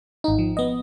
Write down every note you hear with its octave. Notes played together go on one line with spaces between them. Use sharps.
G#1 D#4
F3
B3 D#5